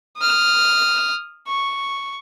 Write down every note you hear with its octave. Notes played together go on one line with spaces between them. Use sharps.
D#6 F6
C#6